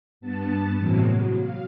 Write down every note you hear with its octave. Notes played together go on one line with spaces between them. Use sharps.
G2 B3 A5 A6
A2 C3 E3 F#3 G#3 A#3
F#3
F5